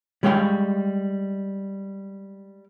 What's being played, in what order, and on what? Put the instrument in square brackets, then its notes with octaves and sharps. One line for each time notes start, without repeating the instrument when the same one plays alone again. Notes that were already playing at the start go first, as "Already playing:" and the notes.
[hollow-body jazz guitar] G3 G#3 C#5 F5 G5